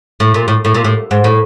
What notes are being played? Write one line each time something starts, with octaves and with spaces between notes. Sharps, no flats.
A2
A#2
A2
A2
A#2
A2
G#2
A2